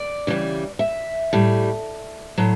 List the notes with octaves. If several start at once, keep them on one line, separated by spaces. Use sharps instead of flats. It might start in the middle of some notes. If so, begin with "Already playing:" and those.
Already playing: D5
C#3 E3 G3
E5
A2 G3
A2 F#3